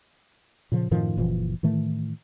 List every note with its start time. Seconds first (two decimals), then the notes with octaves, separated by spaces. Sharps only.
0.72 A#2 C#3 F3
0.91 F#2 A2 D#3 F3
1.17 F#1 A#2 E3 F3
1.63 A2 D#3 E3 A3